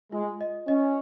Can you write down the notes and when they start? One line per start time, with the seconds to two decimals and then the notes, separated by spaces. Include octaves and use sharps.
0.12 G#3 F4
0.41 D#5
0.67 C#4 D#5